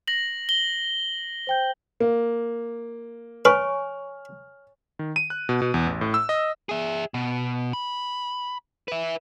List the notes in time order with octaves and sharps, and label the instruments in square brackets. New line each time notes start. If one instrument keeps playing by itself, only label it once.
[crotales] A#6 F#7
G7
[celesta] C5 G5 G6
[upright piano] A#3
[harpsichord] B4 [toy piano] C#5 G#5 C#6 [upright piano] F6
[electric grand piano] D#3
D#7
F#6
B2
B2
E2
A1
A2
E6
D#5
[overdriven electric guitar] G#4 E5
B2
B5
B4 E5